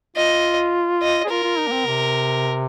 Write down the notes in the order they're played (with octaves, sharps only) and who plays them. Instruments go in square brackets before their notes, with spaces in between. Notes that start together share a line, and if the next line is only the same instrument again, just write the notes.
[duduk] F4 [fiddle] D#5
[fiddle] D#5
[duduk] G#4
[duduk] F4 [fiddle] A#4
[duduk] F4
D#4
A#3
C4
C3